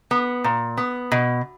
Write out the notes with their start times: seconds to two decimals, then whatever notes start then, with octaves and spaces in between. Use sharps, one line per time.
0.11 B3
0.44 A#2
0.77 B3
1.12 B2